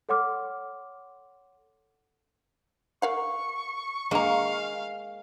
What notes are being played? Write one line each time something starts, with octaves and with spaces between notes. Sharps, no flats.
A4 C#5 F#5 C6 D6 F6
A#4 F5 F#5 C#6
G#3 A#3 D4 F5 A#5